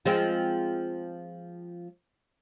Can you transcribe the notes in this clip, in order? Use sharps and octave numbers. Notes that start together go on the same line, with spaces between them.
F3 G#3 C4